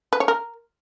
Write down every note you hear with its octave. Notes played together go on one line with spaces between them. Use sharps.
B4
C#5
A#4